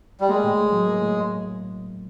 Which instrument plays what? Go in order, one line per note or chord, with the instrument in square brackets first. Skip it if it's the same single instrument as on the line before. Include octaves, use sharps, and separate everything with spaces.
[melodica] G3
[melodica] G#3 [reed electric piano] A#3
[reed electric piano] A2
A2
F#3
A#3
A2